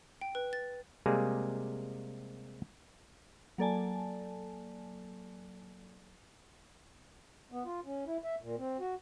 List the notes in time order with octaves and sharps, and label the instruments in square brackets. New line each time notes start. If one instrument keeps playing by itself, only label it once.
[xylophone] G5
B4
A6
[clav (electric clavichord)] C3 G3 G#3 A#3 G#4
[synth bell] F#3 A#3 A4 D5 G#5 A5
[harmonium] B3
F4
C#4
E4
E5
A#2
C4
F#4